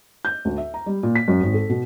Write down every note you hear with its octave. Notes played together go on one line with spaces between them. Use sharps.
G6
D2
E5
A#5
G3
A#2
B6
F#2
G#1
A4
B2